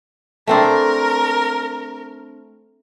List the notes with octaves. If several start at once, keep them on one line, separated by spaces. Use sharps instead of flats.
A3 C4 D4 A#4